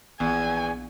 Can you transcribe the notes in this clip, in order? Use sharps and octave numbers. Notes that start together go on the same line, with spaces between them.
A#1 E2 B3 F5 G#5